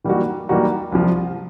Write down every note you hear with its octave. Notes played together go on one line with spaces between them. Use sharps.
E3 G3 A#3 D#4 F#4
E3 G3 A#3 D#4 F#4
C2 C3 F3